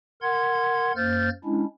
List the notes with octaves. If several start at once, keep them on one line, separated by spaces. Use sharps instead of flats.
A#4 F#5 C6 G#6
F#2 A#3 C5 F6 G6 A6
G#3 C#4 D4 E4